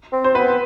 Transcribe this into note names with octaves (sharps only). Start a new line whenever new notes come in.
C4
C5
B3 B4